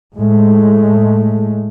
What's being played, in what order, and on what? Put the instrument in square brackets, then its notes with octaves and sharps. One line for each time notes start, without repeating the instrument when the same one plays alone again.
[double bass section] A2 G#3 A3